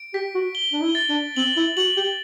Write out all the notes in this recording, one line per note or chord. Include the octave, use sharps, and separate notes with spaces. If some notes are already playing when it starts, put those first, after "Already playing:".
Already playing: D7
G4 B6
F#4
G7
D4
E4
A6
D4
C4 F#7
E4
F#4 F#7
G4